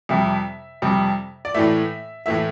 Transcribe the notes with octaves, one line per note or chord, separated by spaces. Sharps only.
F2 C3 G3 E5
F2 C3 G3
D5
A2 E3 A3 E5
A2 E3 A3 E5